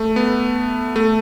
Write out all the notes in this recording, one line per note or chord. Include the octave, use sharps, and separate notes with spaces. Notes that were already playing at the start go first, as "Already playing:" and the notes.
Already playing: A3
B3
A3